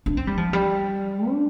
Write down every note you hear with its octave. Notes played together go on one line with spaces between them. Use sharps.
D4
C4
G3
F3
G3
D4